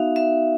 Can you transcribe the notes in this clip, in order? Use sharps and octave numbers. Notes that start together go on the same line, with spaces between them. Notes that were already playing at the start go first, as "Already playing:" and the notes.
Already playing: B3 D#4 F#4 E5 F5
E5